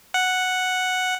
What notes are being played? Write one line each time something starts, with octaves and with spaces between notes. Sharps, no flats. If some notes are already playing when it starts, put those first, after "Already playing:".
F#5